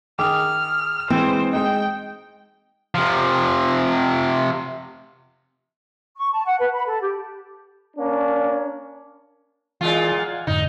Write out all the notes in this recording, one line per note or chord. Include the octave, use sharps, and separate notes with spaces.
D#3 G#4 D6 F6
E3 G#3 C4 C5
G#3 D#4 G5
C3 F3
C#6
A5
F#5
B4
B5
A4
G4
A#3 C#4 D4
A#2 E3 G#3 F4
F5 F#5 G#5
F2 G#2 D3 D#4